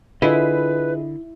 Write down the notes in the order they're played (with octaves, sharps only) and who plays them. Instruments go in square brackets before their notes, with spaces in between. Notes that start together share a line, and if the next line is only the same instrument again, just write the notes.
[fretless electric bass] D3 [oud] E4 [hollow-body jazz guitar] F4 G#4 D#5 [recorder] B4